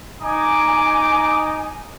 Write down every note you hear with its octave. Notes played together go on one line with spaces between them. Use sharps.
D#4 G#5 D6